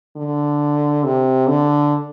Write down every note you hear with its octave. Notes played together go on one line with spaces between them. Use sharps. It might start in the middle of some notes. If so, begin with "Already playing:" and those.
D3
C3
D3